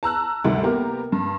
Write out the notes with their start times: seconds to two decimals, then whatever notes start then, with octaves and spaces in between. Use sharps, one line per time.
0.03 A5 A#5 E6 F#6
0.44 D2 C3 D#3 G3
0.63 A#3 B3 G4 A#4
1.12 G2